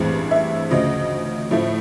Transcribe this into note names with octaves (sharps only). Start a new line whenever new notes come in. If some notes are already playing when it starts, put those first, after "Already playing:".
Already playing: A1 G2 E3 G#3 C4
E5
D2 C#3 F3 D#5
A2 F3 A3